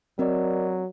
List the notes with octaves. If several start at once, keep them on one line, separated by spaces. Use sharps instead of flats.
F#3 C4 A#4 D5 D#5